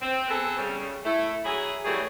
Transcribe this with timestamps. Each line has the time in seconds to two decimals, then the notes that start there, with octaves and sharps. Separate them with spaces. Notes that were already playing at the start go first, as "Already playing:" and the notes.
0.02 C4
0.28 B3 C4 G#4 A4 B4
0.58 C#3 G3
1.05 A3 E4
1.44 F#3 E4 G#4
1.85 E3 F#3 G3 A3 G#4